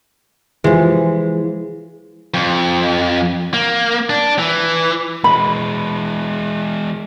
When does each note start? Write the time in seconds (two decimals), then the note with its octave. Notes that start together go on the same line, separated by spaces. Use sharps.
0.64 E3 F3 G#3
2.34 F2
3.54 A#3
4.10 D4
4.39 E3
5.24 E3 G#3 B5